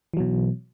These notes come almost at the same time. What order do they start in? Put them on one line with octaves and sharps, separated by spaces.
E3 F#3 B2